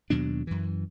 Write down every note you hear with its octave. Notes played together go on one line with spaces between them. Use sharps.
D#2 B2 F#3 D4
F#2 E3